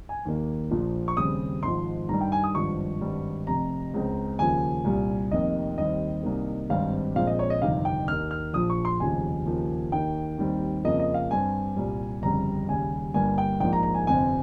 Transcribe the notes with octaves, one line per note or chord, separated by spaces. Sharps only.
G#5
D#2 D#3 A#3
A#1 A#2 F3
C#6
D#2 C#3 G3 C4 D#6
G#1 G#2 F3 C6
G2 D#3 G3 A#5
G5
G#5
D#6
G#1 G2 F3 C#6
G#1 G2 G3
F1 F2 C3 A#5
C#2 C#3 G#3 C4
D#2 C#3 F3 A#3 G#5
C2 A#2 G3
F1 F2 D#3 A#3 D#5
D#2 D#3 G3 C4 D#5
C2 C3 D#3 A#3
G#1 G2 G3 C4 F5
A#1 A#2 G#3 C4 F5
D#5
C#5
D#5
G1 F2 C3 D#3 F5
G5
D#2 D#3 A#3 F6
F6
A#1 A#2 F3 D#6
C#6
C6
F1 D#2 C#3 F3 G#5
D#2 C#3 F3 A#3
D#2 D#3 A#3 G5
D#2 D#3 G3 C4
F2 C#3 F3 A#3 D#5
D#5
F5
G2 G3 C4 G#5
C2 A#2 G3
G1 F2 C#3 G3 A#5
D#2 C#3 G3 G#5
G1 G2 G3 A#3 G#5
G5
A#1 G#2 F3 A#3 G5
A#5
A#5
G#5
G1 F2 C3 G3 C4 G#5